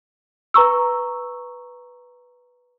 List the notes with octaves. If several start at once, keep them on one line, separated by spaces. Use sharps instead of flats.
B4 A#5 C#6 E6